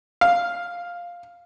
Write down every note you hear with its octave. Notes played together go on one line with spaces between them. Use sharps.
F5